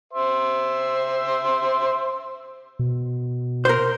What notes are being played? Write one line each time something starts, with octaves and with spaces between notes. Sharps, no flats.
C5 E5 C6
B2
A#4 C5